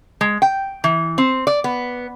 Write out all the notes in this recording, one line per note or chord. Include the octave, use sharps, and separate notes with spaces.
G#3
G5
E3
C4
D5
B3